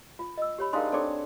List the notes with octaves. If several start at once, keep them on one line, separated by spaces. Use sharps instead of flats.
F4
D#5 E6
G4 C#5 B5
G#3 D4 D#4 A#4 F5 C6
C4 D4 A4 C#5 D6